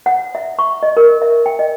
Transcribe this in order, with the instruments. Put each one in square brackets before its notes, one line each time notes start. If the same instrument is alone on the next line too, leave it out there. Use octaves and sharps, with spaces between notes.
[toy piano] F#5
E5
C#6
D#5
A#4
E5
G5
D#5